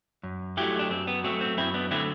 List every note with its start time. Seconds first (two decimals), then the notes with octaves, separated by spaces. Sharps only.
0.23 F#2
0.57 F#3 A3 E4 G4
0.79 D4
0.90 F#2 C4
1.07 B3
1.24 F#3 A3 C4
1.41 C4
1.57 F#2 C4 E4
1.74 B3 D4
1.91 D3 F#3 A3 C4 E4